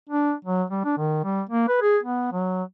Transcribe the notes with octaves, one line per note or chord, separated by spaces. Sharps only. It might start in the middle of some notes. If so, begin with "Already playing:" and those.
D4
F#3
G3
D4
D#3
G3
A#3
B4
G#4
B3
F#3